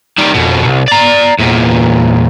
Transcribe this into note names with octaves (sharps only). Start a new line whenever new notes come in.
D#3 G3
F2 B2
C2
D5 A#5
E2 A#2